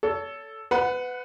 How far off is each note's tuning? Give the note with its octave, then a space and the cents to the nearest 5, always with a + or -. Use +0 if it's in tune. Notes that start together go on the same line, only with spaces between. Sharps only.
A4 +0 C#5 +35
B4 +25 F#5 -15